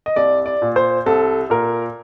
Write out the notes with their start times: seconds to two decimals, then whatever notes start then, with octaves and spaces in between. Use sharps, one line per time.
0.06 D#5
0.16 C2 D5
0.46 D5
0.62 A#2
0.76 C5
1.06 C2 A4
1.50 A#2 A#4